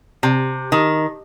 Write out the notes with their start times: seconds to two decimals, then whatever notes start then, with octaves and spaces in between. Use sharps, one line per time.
0.23 C3
0.72 D#3